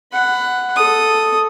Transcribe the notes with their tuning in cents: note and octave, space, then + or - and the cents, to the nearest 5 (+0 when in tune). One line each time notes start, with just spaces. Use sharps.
F#5 +0 B5 +20
A4 +0 D#6 +0